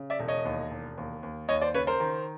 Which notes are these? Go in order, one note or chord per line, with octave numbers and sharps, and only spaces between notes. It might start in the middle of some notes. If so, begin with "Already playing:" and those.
Already playing: C#3
D5 E5
E1
C#5 D#5
D#2
E1
D#2
D#2
D#2 C#5 D#5
C5 D5
C#3 B4 C#5
A#4 C5
D#3